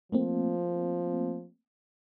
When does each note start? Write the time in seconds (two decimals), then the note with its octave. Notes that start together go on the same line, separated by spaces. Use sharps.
0.12 F3 A3 A#3 C4